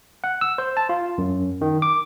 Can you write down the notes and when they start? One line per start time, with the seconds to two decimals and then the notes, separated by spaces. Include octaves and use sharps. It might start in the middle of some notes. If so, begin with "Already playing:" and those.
0.24 F#5
0.41 E6
0.58 C5
0.77 A5
0.89 F4
1.18 F#2
1.61 D#3
1.82 D6